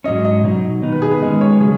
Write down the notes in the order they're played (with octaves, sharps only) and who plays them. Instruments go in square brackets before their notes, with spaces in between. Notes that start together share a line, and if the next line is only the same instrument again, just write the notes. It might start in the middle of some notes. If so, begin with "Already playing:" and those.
[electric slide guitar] G#2 F#3 C#4 [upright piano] D#5
[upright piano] D#5
[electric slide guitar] B2 F#3 D#4
D#3 B3 D#4
[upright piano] B4
G#4
B4
[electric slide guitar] D#3 G#3 C#4 [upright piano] D#5
[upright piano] C#5
[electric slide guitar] C#3 F#3 [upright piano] G#4